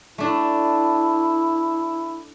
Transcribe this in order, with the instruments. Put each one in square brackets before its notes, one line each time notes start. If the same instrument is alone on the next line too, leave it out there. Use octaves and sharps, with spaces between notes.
[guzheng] A3 D4 [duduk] E4